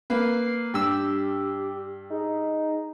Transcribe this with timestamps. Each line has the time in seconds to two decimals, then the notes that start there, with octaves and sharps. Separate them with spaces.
0.10 A#3 B4 C7
0.74 G2 D4 G4 E6
2.10 D#4 G#4